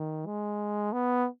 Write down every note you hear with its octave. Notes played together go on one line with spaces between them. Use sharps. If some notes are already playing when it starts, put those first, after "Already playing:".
Already playing: D#3
G#3
B3